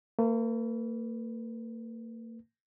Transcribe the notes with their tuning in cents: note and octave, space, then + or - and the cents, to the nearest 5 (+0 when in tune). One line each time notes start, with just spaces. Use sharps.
A#3 -40 B4 +0